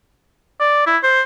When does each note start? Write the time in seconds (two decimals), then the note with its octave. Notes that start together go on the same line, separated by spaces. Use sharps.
0.60 D5
0.87 E4
1.03 C5